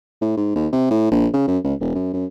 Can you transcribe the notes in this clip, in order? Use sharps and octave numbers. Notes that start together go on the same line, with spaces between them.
A2
G#2
D#2
C3
A2
A#1
C#3
F#2
C#2
E1
F#2
F#2